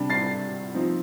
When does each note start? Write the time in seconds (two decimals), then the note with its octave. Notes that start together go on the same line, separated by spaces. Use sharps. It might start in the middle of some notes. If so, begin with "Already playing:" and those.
Already playing: C3 G3 D4
0.10 A6 C7
0.74 F3 C4 D#4